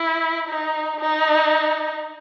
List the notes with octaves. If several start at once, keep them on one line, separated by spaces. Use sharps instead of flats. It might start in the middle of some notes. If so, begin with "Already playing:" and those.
Already playing: E4
D#4
D#4